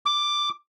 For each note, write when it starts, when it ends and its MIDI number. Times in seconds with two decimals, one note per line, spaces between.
0.06 0.49 86